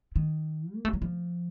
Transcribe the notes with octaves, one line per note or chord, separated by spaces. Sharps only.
D#3
A#3
A3
F#3
F3